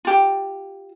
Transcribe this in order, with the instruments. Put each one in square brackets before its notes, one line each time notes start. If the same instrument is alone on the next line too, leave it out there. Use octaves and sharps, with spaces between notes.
[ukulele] F4 G4